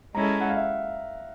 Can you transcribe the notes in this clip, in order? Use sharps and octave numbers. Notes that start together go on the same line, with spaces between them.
G#3 C#4 E4 A4 A#5
F#5
F5
E5